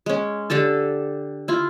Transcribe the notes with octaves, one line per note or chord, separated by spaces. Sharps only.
G#3 C#4
D3 G4 A4 A5
E4 F4